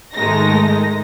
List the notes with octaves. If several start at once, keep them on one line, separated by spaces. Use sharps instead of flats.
G#2 D#3 G#3 A3 D#4 A#6